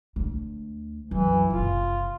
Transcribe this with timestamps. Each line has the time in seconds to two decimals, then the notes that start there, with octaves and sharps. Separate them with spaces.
0.16 D2
1.11 C2 F#2 E3
1.50 F#1 C3 F4